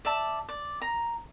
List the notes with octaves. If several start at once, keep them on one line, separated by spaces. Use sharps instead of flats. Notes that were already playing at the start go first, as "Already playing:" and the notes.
D5 E5 A5
D5
A#5